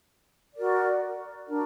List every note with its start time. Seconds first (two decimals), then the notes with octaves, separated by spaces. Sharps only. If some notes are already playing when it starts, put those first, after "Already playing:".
0.55 F#4 A#4 D5
1.48 D4 F#4 A#4